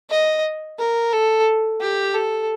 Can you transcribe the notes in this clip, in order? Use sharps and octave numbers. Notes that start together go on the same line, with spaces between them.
D#5
A#4
A4
G4
A4